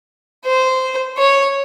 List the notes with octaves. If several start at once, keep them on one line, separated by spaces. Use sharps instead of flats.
C5
C#5